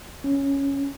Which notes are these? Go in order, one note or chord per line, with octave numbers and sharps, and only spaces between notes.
C#4